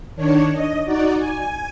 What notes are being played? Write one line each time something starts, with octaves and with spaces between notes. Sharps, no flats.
D#3 D4 C#5
D#5
D#4 F#4 D5
G#5